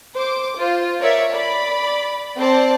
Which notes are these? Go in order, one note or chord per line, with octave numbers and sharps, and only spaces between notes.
C5 D6
F4 C5
A#4 C#5 D5 E5
D5 B5
C4 C5 D5 A5